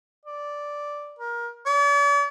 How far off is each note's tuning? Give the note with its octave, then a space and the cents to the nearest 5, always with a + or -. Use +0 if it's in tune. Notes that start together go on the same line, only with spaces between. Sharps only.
D5 -5
A#4 +20
D5 -45